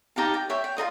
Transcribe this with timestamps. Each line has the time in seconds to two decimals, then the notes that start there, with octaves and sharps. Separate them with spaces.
0.16 D#4 G4 F5 A5
0.34 G5
0.50 C#5 E5 G5
0.64 G5
0.77 F4 A#4 D#5 D#6